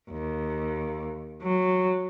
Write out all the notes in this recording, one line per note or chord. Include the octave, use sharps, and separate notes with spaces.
D#2
F#3